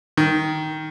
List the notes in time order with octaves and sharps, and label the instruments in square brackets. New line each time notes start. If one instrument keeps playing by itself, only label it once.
[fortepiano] D#3